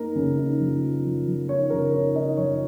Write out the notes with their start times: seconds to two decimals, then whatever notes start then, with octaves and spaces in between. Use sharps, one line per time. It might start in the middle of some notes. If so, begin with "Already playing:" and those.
Already playing: A#3 D#4 A#4
0.16 C#3
0.38 D#4
0.60 F3
0.82 F3
1.05 F3
1.27 F3
1.48 D#4 C#5
1.70 C#3 A#4
1.94 D#4 C#5
2.15 D#4 D#5
2.37 F3 C#5